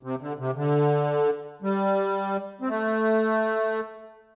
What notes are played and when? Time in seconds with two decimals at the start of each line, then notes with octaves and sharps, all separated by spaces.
0.03 C3
0.21 D3
0.39 C3
0.56 D3
1.62 G3
2.61 C4
2.69 A3